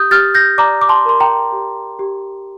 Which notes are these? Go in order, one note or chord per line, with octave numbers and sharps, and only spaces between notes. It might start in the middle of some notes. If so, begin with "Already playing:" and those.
Already playing: G4 D#6 G6
G4 F6 A6
G6 A#6
D5 A#5 D6
D6
A5 C6
A#4 C6
G5 A#5
G4
G4